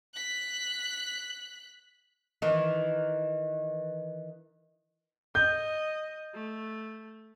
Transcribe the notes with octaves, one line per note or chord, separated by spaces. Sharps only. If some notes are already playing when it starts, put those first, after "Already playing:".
F#6 B6
D#3 E3
D#5 G6
A3